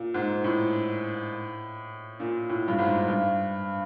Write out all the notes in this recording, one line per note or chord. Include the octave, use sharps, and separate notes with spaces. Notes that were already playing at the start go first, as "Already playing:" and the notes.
Already playing: A#2
G#2
A2
A#2
A2
G2
G#2
G2